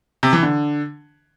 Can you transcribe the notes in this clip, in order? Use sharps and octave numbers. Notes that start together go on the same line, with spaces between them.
C3
E3
D3